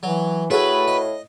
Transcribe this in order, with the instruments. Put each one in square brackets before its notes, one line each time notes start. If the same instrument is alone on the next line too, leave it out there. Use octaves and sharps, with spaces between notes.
[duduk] E3 [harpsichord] F#3
[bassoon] A2 [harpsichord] A3 G#4 [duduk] F#4 [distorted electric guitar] B4
[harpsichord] D#5